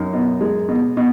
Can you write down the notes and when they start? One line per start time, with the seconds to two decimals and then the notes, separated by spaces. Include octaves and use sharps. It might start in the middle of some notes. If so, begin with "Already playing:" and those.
Already playing: F#2 D#4
0.13 B2
0.41 G#3
0.69 B2
0.97 B2